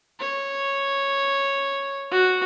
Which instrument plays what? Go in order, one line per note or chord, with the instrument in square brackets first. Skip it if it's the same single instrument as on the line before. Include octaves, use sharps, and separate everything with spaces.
[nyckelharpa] C#5
F#4